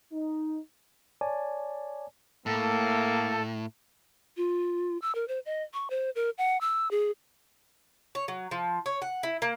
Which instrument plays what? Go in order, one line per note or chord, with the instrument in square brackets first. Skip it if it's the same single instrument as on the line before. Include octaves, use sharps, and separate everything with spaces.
[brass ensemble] D#4
[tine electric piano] C#5 D5 G#5 A5
[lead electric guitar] A2 [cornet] A#3 [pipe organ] A4
[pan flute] F4
E6
A#4
C5
D#5
C#6
C5
A#4
F#5
E6
G#4
[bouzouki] C#5
F#3
F3
C#5
F#5
E4
A#3